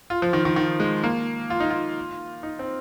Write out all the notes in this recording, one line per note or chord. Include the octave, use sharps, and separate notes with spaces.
F4
F3
D#3
D#3
D#3
G#3
A#3
F4
D#4
F4
D#4
C4